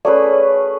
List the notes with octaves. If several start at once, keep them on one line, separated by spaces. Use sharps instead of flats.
A3 C#4 G#4 B4 D5